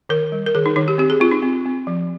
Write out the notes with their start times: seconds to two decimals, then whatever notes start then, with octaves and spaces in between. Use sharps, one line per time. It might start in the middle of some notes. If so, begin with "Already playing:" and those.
0.09 D#3 A#4
0.32 G3
0.46 A#4
0.55 D#3 G#4
0.66 D#4
0.76 D#3 D#4
0.88 G4
0.98 C4 G4
1.10 G#4
1.20 C4 F4
1.31 D#4
1.42 C4
1.65 C4
1.87 F3